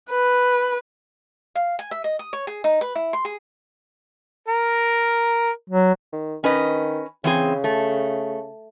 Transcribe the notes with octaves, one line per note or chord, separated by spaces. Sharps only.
B4
F5
G#5
E5
D#5
D#6
C#5
G#4
D#4
B4
E4
C6
G#4
A#4
F#3
D#3
D#3 C#4 B4 D#5
C#3 E3 C4 G#4
A3